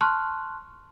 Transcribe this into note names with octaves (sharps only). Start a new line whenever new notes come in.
A5 C6 C#6 F6 F#6